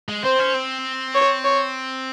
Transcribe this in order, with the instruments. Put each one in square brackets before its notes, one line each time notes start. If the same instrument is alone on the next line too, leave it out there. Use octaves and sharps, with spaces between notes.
[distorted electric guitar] G#3
[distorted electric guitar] C4 [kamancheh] C5
[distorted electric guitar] C#4
C4
[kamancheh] C#5
C#5